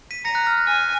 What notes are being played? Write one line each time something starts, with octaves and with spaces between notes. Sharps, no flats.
B6 D#7
A#5 A#6 C#7
F#6 A#6
F6
F#6
G#5 F6